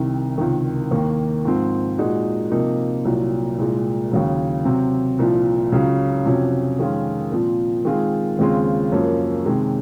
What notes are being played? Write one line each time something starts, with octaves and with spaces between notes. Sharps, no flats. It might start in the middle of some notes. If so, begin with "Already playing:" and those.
Already playing: C2 C3 D#3
C#2 C3 D#3
D#2 D#3 A#3
G#2 F3 C4
A#2 G#3 D#4 F#4
C3 F3 A#3 D#4
C2 A#2 F#3
C2 A#2 G#3
D#2 C#3 F#3
C3 F#3 C4
C2 A#2 F3
C#2 C#3 F#3
F2 C3 F#3 C#4
F2 D#3 G#3 C#4 F4
A#2 F3 C4
D#3 G#3 C4 F4 G#4
D#2 C#3 G#3 C4 F4
F#2 F3 A#3 C#4
C3 D#3 G#3